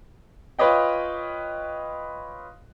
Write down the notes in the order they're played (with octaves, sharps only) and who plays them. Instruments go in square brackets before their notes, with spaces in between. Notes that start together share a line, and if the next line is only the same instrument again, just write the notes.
[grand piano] F4 B4 C#5 D#5 G5